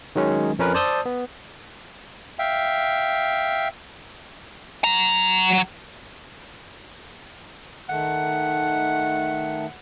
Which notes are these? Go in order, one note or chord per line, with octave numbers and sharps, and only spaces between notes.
D#3 F#3 G#3 C#4
F2 C#4 A#4 B4
C5 D5 A5 D#6 E6 G6
B3
E5 F5 G5
F#3 A#5
D#3 A3 F#5